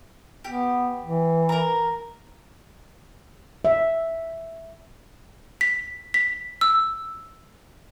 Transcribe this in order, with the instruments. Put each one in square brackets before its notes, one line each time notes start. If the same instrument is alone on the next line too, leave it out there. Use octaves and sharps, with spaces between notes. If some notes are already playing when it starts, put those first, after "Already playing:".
[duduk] B3 [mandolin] G4
[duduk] E3
[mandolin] A#4 A#5
[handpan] E5
[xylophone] B6
B6
E6